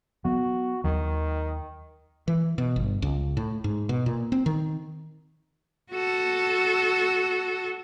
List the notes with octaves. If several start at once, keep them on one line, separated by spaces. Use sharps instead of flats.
F#3 B3 F#4
D#2 D#3 F#3
E3
B2
G1
C#2
A2
G#2
B2
A#2
C4
D#3
F#4 A4